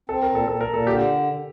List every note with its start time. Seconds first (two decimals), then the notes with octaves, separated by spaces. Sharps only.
0.09 C4 A4
0.23 A#4
0.29 A#2
0.35 A4
0.48 A#2 A4
0.61 A#4
0.67 A#2
0.74 A4
0.86 D3 G4